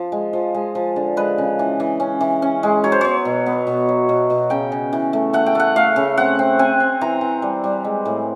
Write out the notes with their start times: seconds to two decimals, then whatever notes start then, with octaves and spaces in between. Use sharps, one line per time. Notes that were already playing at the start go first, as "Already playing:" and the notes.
Already playing: F3
0.12 G#3
0.33 F3
0.54 G#3
0.75 F3
0.96 D3
1.17 G#3 B4
1.38 C#3
1.59 E3
1.80 E3
2.00 C#4
2.21 E3
2.42 C#4
2.63 G#3
2.84 F#3 C#5
2.92 C5
3.01 B3 C#5
3.25 B2
3.46 B3
3.67 B2
3.89 F#3
4.09 B2
4.30 B2
4.50 C#3 G5
4.72 C#3
4.93 E3
5.13 A3
5.33 A3 F#5
5.46 G5
5.55 A3 F#5
5.76 A3 F5
5.96 C#3
6.17 C4 F#5
6.39 C4
6.59 C4 G#5
6.80 C4
7.01 E3 A#5
7.21 E3
7.42 G3
7.64 G3
7.84 G#3
8.05 A2